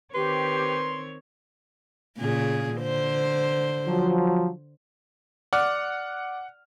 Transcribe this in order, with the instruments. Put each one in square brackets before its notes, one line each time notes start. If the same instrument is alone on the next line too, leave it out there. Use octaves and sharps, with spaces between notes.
[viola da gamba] D#3 C4 C#5 [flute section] G4 [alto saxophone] B4 [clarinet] C6
[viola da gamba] A#2 C#3 G#4
D3 C5
[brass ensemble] F3 F#3
[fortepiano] D5 [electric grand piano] F#5 F6